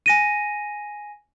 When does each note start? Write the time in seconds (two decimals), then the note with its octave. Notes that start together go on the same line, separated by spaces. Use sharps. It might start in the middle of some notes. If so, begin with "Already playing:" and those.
0.06 G#5 A#6 D#7